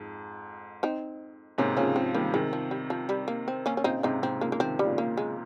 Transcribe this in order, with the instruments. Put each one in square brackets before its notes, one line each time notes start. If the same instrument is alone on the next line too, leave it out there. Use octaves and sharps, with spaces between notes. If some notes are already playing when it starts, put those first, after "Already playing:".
Already playing: [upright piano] F2 G#2
[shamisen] C4 D#4
[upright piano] G#2 C3 [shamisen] A#3 C#4
[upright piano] C#3 F3 [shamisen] A#3 C#4
[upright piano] C#3 F3 [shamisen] C4
[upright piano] D#3 G3 [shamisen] A#3
[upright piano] C3 D#3 [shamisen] G#3
[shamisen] F3
G3
F3
G3
A#3
C4
A#3 C#4
C#4
[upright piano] A#2 C#3 [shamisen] C4 D#4
[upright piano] C#3
[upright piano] G#2 C3 [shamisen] C4 D#4
[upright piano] G#2 C3 [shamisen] C4
[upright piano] C#3 F3 [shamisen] A#3
[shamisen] A#3
[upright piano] C3 D#3 [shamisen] C4
[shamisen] G3
[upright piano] A#2 C#3
[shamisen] A#3
G#3